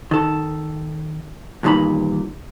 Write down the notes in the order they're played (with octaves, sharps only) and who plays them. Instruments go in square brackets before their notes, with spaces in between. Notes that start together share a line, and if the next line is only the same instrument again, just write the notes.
[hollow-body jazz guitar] D#3 A4
E2 G2 A#2 D#3 D#4 B5